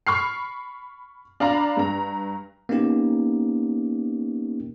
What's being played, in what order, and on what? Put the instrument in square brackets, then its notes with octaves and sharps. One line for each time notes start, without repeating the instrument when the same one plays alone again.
[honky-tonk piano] B5 C#6 F6 C7
D4 F5 A#5 B5
G2 A#5
[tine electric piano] A#3 B3 C#4 D#4 G4